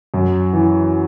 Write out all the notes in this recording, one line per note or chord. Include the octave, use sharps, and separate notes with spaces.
F#2
E3